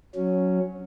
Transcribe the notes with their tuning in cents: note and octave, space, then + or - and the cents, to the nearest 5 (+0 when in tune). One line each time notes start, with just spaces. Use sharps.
F#3 -10 C#4 +0